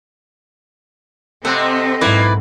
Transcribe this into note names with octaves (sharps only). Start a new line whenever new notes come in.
C3 A3 C4 D#5 F#5 B5 E6 F#6
B1 G#2 A#3 E4 B4 D5